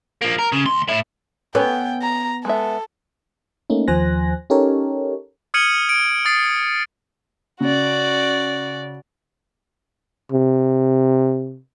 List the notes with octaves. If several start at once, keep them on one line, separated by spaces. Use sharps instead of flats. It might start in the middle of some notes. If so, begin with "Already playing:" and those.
F3 A#3
A#4
C#3
D2 C6
A2 E4
B3 C#4 A4 C#5 G5
A#5
G#3 B3 A4 E5
A3 A#3 C#4 D#4
D#2 F3 C5 G#5 F#6 A#6
C#4 D#4 G4 A4 A#4 C#5
D#6 F6 G#6 C#7 D#7 F#7
D7
D#6 A6 C7
C#3 F#4 D5
C3